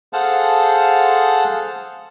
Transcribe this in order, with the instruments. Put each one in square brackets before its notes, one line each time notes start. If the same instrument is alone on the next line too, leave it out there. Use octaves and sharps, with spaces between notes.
[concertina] G#4 A4 C5 F5 F#5 A5